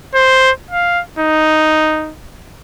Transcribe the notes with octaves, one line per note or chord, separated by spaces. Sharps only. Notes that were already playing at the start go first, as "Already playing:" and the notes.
C5
F5
D#4